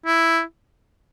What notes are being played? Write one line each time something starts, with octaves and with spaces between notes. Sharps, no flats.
E4